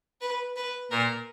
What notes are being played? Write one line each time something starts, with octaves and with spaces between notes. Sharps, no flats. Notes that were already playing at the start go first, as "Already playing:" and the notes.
B4
B4
A#2 A#4